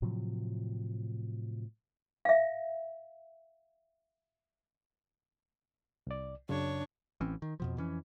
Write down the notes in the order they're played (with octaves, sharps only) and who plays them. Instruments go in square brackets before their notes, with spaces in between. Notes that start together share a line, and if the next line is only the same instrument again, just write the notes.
[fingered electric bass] A2 C3 F3 F#3
[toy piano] E5 F5
[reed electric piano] C2 D5
[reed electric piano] F#2 C#3 [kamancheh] D4 C#5
[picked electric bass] A1 E3 C4 C#4
D#3
F2 B2 F3
F2 E3 C#4